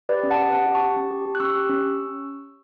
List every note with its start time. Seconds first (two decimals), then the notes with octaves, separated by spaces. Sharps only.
0.09 G4 B4 D5
0.23 C#4
0.30 F#5 A5
0.37 G4
0.52 C#4 F#5 A5
0.67 G4
0.75 A5 C#6
0.81 G4
0.96 C#4
1.11 G4
1.26 G4
1.35 F#6
1.40 C#4 C#6 E6
1.54 G4
1.69 C#4